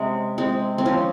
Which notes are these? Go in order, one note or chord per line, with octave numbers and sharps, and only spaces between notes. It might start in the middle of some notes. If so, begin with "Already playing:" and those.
Already playing: C3 G#3 C#4
G#3 C4
C4
F3 C#4